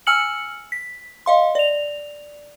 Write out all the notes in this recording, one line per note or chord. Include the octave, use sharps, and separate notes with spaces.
G#5 E6 F6 C#7 F#7
B6
D#5 F5 C6
D5 F7